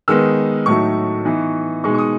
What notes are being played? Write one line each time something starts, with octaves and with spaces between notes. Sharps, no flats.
D#3 G#3 B3 D#4 E6
A2 F#3 A3 D#4 C#6
E3 B3 D#4
B2 G#3 D#4 C#6
C#6
D#6